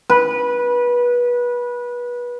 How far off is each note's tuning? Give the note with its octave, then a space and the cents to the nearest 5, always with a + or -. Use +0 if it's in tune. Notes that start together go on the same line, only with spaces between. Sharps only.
B4 -25